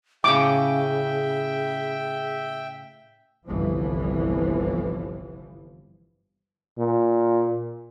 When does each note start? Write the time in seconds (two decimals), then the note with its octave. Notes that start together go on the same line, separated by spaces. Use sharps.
0.24 A2 C#3 G#4 E5 G5 D6
3.45 G1 C2 E3 F3
6.78 A#2